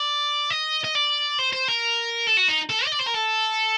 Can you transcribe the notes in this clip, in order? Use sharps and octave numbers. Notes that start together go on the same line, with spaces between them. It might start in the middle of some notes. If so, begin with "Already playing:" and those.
Already playing: D5
D#5
D#5
D5
C5
C5
A#4
A4
F#4
D#4
A4
D#5
D5
C5
A#4
A4